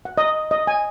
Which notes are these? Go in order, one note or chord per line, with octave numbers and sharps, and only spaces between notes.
F#5
D#5
D#5
G#5